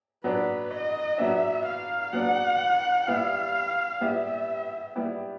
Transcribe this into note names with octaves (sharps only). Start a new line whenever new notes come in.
F#3 B3 D4 B4
D#5
F#3 B3 D4 E5
F5
F#3 B3 D4 F#5
G3 B3 E4 G4 F5
G3 B3 E4 G4 E5
G3 B3 E4 G4